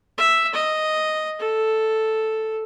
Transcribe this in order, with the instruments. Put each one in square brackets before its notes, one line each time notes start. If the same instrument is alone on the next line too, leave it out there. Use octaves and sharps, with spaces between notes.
[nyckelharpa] E5
D#5
A4